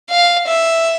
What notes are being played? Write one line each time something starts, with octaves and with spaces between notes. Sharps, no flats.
F5
E5